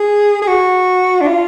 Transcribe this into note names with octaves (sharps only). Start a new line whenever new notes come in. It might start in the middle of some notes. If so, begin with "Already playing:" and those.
Already playing: G#4
G#4
F#4
D4
F4